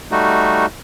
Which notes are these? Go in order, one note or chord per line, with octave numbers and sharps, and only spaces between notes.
G3 A3 D#4 F#4